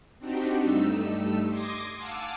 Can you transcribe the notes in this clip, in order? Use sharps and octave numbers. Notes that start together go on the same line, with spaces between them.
C4 D4 D#4 F#4 G4
G2 G3 A3 D#4 E6
C6 D6 D#6 G#6 A#6
F5 F#5 G#5 A5 D6 E6